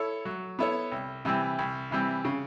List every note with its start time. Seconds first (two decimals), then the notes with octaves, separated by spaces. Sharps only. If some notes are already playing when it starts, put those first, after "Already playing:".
Already playing: E4 A4 C#5
0.25 F#3
0.59 B3 E4 A4 C#5
0.92 C2
1.25 C3 E3 G3 C4
1.59 C2
1.91 C3 E3 G3 C4
2.25 C#3